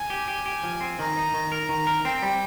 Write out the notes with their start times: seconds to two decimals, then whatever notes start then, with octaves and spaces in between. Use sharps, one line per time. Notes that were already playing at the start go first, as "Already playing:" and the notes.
Already playing: G#5
0.10 G4
0.28 G4
0.46 G4
0.64 F3
0.81 C4
0.99 D#3 A#5
1.17 D#4
1.34 D#3
1.52 A#4
1.69 D#3
1.87 A#4
2.05 C4 G5
2.22 G3